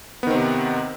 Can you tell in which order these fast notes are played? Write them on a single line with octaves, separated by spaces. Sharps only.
B3 D#3 C4 C3